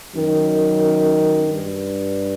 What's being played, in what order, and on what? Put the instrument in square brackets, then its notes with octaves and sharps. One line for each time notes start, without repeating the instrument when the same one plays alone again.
[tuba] F#2 [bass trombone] D#3
[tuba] G2